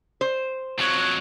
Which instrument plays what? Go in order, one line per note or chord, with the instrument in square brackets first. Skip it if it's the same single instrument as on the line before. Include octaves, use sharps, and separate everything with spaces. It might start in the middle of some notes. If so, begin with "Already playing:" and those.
[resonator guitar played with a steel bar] C5
[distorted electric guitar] F2 F#3 [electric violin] C#5 F#6